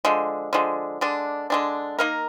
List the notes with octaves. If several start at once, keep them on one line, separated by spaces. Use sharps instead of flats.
D3 F3 G#3
D3 F3 G#3
D3 G#3 D4
D3 G#3 D4
A#3 D#4 A#4